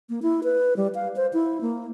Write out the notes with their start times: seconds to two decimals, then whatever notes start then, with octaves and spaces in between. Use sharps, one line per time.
0.09 A#3
0.22 E4
0.44 B4
0.77 G3
0.95 F5
1.16 C5
1.33 E4
1.61 A#3